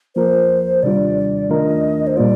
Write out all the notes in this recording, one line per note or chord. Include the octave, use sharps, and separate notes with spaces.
F3 A#3 F4 A#4 C5
C3 D#3 G3 D4 F4 D5
D#3 A3 D4 F4 A#4 D#5
C5
A#2 G3 A#3 F4 D5